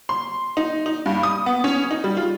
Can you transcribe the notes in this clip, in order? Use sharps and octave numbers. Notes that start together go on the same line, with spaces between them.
C6
D#4
D#4
G2
D#6
B3
C#4
D#4
G3
F4